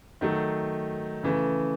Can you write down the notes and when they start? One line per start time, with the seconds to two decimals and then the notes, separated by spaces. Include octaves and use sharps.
0.21 D#3 F#3 A3
1.23 C#3 E3 A3